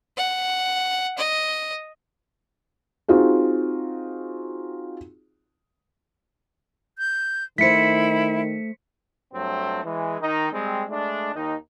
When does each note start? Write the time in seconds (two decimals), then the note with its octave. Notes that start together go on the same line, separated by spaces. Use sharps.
0.17 F#5
1.18 D#5
3.08 C4 D#4 F4 F#4 G#4
6.98 G6
7.58 D#3 A3 E4 C5 B6 C#7
9.33 G2 F#3 A3 C4
9.85 E3 G#3
10.21 D#3 D#4
10.52 G3 G#3 C4
10.89 G#3 A3 D4
11.34 D#2 D#3 D#4